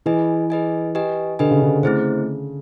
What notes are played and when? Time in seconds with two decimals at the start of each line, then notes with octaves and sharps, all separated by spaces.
0.06 E3 G#4 B4 D#5 G#5
0.50 G#4 B4 D#5 G#5
0.95 G4 B4 D#5 G#5
1.39 D3 G4 B4 D#5 G#5
1.51 C#3
1.62 D3
1.83 C#3 A3 C4 E4 G#4 C5